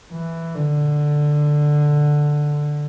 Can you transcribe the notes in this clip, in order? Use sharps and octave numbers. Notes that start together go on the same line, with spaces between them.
E3
D3